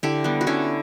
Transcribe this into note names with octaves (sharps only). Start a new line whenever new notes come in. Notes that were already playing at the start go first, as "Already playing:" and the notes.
D3 E4 G4
G3 B3
F#4
D3 C#4 E4